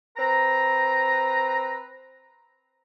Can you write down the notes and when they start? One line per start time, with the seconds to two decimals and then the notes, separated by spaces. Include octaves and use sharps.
0.17 C4 B4 A#5